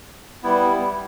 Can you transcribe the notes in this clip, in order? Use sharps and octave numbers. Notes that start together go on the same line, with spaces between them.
G3 B3 E4